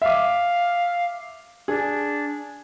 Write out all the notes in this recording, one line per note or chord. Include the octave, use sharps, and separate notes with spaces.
E5 F5 D6
D4 G#4